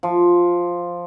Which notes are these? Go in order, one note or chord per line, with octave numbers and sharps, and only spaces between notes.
F3